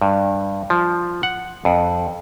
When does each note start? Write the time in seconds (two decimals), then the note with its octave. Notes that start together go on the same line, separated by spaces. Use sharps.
0.01 G2
0.70 F3
1.23 F#5
1.65 F2